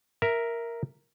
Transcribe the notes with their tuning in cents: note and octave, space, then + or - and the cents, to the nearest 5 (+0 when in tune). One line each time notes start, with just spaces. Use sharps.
A#4 +0 E5 +0